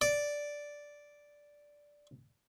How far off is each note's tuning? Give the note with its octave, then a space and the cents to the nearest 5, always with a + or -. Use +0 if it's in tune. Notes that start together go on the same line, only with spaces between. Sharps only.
D5 -5